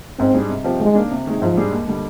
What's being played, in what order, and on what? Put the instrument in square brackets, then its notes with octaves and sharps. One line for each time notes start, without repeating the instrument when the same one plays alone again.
[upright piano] G#2 [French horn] C4
[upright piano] G3 D4 G#4
C3
F3 C4 G4
[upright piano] D#3 [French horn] G#3
[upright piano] A#3 D4
C3
D#3 G#3
[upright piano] G#2 [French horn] F3
[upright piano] G3 D4 G#4
D#2
D3 G3